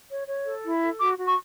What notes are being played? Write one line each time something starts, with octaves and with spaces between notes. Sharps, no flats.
C#5
C#5
A4
E4
A4
F#4 D6
F#4
C#6